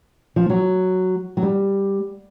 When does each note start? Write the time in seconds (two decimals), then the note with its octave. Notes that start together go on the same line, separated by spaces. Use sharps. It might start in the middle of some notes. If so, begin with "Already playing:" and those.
0.36 F3
0.50 F#3
1.37 F#3
1.43 G3